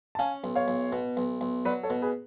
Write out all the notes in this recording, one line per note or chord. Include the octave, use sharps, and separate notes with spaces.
A5
C#4 F5 G#5
B1
C#5 F5
B1
B2
B1
B1
F#3 B4 D5
A4 C#5
B2
G#4 B4